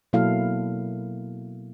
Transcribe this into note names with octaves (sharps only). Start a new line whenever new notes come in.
B2 F#3 A#3 E4 A4 F5